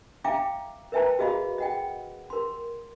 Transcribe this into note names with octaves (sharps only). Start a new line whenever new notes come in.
E5 F5 G5 A#5 D6
A#4 B4 E5 G5 A5 A#5
F#4 G#4 D#5 F5 B5
D#5 F#5 G5
A#4 C6